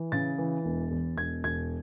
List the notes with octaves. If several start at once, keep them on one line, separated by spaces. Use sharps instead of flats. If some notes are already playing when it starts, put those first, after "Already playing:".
Already playing: E3
C#3 A6
E3
E1
E2
E1 G#6
E1 G#6